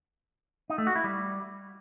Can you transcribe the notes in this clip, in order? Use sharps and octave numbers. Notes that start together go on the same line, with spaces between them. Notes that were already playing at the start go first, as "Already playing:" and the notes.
D#4
A3
F#4
E4
G3